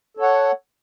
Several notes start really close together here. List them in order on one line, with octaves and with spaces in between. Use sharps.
A4 C#5 F#5